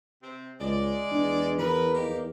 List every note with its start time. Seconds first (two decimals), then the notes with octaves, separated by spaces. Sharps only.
0.23 C3 C4
0.60 C#2 G#3 D5
1.12 E2 D4
1.59 E3 B3 E4 A#4 B4
1.95 A#3 D#4 G4